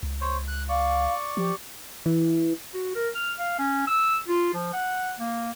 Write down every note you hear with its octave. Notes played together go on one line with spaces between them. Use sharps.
C#2
C5 C#5
F#6
D5 F5 C#6
F3 G4
E3
F#4
A#4
F6
F5
C#4
E6
F4
F3
F#5
A#3